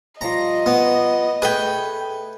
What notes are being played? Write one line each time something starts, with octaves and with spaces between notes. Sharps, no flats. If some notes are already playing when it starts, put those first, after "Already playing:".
F3 G3 F4 D#5 A#5
B3
A3 G#4 B4 G5